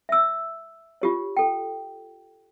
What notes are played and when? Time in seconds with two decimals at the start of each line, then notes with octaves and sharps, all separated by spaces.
0.09 E5 E6
1.02 F4 G4 C#5
1.37 A4 G5